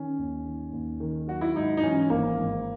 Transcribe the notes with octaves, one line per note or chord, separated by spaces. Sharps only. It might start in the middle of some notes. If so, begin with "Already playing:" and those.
Already playing: D#3 C#4
D#2
D#3
D#2
D#3
F#3 F#4
E4
G#2 D#4
D#4
E3 C#4
G#1 A#3
G#1